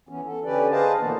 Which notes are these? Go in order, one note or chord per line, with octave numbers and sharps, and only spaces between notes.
E3 B3 C#4
A4
D3 C#4 G4 B4 D5
G#4 B4 C5 D#5 F5 A5
B2 D3 E3 A#3 B3